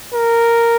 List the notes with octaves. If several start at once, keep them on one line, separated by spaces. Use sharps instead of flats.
A#4